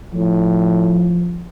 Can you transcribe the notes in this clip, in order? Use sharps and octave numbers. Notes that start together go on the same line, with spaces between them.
A2 F3